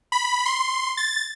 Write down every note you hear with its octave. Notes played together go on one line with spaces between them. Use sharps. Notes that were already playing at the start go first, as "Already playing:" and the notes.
B5
C6
A6